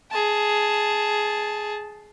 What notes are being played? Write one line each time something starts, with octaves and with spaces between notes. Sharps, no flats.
G#4 A5